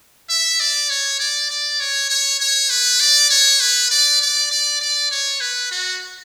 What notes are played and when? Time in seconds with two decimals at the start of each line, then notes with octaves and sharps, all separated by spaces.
0.29 E5
0.60 D5
0.90 C#5
1.20 D5
1.50 D5
1.80 C#5
2.10 C#5
2.40 C#5
2.70 B4
3.00 D5
3.30 C#5
3.61 B4
3.91 D5
4.21 D5
4.51 D5
4.81 D5
5.11 C#5
5.41 B4
5.71 F#4